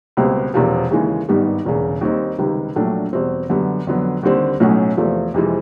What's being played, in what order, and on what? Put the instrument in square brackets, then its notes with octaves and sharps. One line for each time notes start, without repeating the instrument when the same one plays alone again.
[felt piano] C#2 B2 G3 C4
E1 E2 C3 F3
D#2 C#3 E3 G#3
G#1 G2 D#3 G3 B3
E1 E2 C#3
D#2 D#3 G3 C4 D#4
C#2 C3 D#3 G3
A#1 A#2 F#3 A3 D4
E2 B2 G3 C4
F#2 D3 G3 B3
F2 D3 F#3 B3
D#2 D3 G3 C4
B1 A2 F#3 A3 C#4
E2 C3 F3 A3
F2 C3 E3 G#3